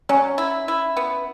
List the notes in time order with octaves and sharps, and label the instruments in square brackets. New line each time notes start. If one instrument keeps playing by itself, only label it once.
[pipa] F#3 [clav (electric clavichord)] C#4
[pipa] E4
E4
B3